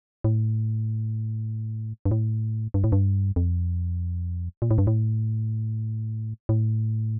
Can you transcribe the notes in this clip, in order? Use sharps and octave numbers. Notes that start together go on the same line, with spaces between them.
A2
G2
A2
G2
A2
G2
F2
A#2
A2
G2
A2
A2